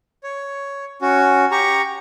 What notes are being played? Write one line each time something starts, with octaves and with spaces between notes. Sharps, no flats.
C#5
C#4 F#4
G4 A#5 C#6